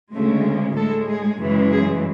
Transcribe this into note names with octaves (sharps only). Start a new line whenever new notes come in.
D2 C#3 G#3 A3
A2 G#3 A4
G#4
F#2 C#3 E3 G#3
G#4